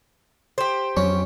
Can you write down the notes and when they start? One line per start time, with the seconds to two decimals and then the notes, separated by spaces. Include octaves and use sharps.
0.58 G4 C5
0.97 F2 F#3 C#4